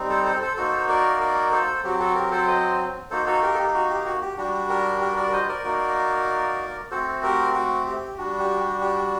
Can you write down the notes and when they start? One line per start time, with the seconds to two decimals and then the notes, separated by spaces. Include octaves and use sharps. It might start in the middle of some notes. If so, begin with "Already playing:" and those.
Already playing: G3 C4 D#4
0.09 A4 C5
0.25 A4 C5
0.42 A4 C5
0.57 A#3 D#4 F#4 A4 C5
0.89 A#4 D5
1.21 A#4 D5
1.52 A4 C5
1.84 F#3 C4 F#4 G4
2.00 F#4 A4
2.15 G4 A#4
2.31 A4 C5
2.47 C5 D#5
3.11 A#3 D#4 F#4 A4 C5
3.26 F#4 A4
3.42 G4 A#4
3.54 A4
3.59 G4
3.74 F#4
3.90 G4
4.06 F#4
4.22 G4
4.38 G3 D4 F#4 G4
4.69 G4 A#4
5.01 G4 A#4
5.17 A#4 D5
5.32 C5 D#5
5.48 A#4 D5
5.64 A#3 D#4 F#4
6.91 A3 C4 F#4 A4 C5
7.23 G4 A#4
7.54 F#4
7.86 G4
8.18 G3 D4 F#4
8.40 G4
8.60 G4
8.81 G4